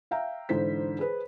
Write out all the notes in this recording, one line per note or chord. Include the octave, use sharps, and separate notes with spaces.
E5 F5 G5 A#5
G#2 D3 E3 C5 B6
G#4 B4 C5